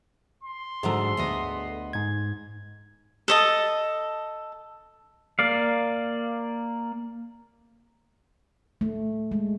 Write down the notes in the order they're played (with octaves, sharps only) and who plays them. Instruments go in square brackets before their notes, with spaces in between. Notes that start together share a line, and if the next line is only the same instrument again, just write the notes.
[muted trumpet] C6
[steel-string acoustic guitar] G#2 D3 F#3 [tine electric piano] G#4 A4
[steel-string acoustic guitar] D2 B3 D#5
[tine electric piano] G#2 G#6
[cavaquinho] A4 D#5 A5
[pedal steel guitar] A#3 D5 F5
[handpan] A3
G#3